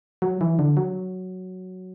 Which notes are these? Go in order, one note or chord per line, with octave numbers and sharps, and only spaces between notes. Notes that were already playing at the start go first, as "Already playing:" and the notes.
F#3
E3
D3
F#3